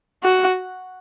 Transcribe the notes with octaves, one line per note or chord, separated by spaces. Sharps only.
F#4